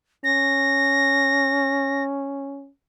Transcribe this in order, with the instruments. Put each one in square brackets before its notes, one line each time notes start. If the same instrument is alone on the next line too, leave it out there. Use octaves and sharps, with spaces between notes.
[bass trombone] C#4 [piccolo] A#6